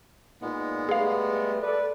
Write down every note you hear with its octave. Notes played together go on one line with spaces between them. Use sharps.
A#2 G#3 B3 D#4
G3 A3 G#4 B4 F5
A4 B4 D5